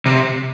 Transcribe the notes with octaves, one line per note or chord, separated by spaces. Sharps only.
C3